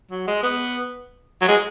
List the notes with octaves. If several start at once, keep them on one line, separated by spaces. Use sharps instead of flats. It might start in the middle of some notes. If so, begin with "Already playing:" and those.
F#3
G#3
B3
F#3
G#3